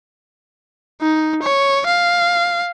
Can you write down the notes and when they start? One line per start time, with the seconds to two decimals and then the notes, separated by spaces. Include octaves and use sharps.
1.01 D#4
1.43 C#5
1.86 F5